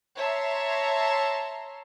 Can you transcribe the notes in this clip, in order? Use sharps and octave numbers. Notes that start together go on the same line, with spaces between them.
C#5 E5 A5 A#5 C6